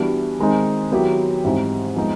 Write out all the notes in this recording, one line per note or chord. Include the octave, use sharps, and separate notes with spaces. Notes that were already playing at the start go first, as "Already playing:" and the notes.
Already playing: E3 G3 B3 D4 F#4
D#3 G#3 C4 D#4
D#3 F#3 B3 E4 G4
G#2 E3 G3 C4 D#4
F3 G#3 B3 D#4